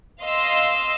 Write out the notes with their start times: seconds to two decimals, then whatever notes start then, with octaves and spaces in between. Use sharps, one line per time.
0.21 D#5 F5 C6 E6